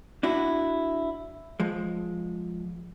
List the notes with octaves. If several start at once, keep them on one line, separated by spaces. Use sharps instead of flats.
D4 E4 F#4
F3 G#3